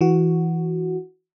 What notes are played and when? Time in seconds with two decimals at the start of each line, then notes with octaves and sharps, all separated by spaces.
0.01 E3 F#4